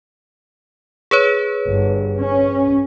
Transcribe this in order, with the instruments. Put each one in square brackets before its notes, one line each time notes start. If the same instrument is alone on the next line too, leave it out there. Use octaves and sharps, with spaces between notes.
[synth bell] G#4 B4 C#5
[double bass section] G1
C#4